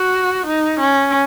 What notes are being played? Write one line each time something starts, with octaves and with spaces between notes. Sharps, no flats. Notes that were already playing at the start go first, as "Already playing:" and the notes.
Already playing: F#4
D#4
C#4